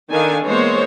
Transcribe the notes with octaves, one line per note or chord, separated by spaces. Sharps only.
D#3 D4 A4 F5 G#5
E3 G#3 A#3 B3 C5 C#5